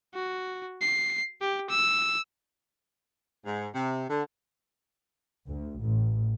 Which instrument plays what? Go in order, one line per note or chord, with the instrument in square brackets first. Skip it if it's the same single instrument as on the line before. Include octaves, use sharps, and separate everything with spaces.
[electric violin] F#4
C7
G4
E6
[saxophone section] G#2
C3
D3
[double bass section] D2
A1